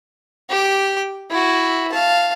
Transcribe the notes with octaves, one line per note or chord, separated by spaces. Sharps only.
G4 D6
E4 F#4
F5 A5